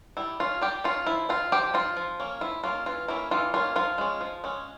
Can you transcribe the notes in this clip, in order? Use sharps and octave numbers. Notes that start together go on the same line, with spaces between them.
G3 E4
C#4 F4
G3 G4
C#4 F4
F3 E4
C4 F4
F3 G4
C4 F4
F3
A#3 C#4
F3 E4
A#3 C#4 F4
E3 F4
A#3 C#4 E4
E3 F4
A#3 C#4 F4
F3 F4
G#3 C#4
F3
G#3 C#4